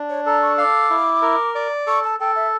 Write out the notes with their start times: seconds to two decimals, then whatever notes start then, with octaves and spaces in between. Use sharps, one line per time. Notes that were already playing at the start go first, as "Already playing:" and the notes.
Already playing: D4
0.09 C#5
0.26 A4 A#5
0.42 C#6
0.58 F5 D6
0.90 E4
1.22 A#4
1.55 D5
1.87 A4 C#6
2.03 A5
2.20 A4 G5
2.36 E5